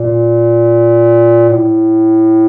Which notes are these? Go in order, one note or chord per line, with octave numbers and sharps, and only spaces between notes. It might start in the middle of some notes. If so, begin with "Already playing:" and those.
Already playing: A#2
A2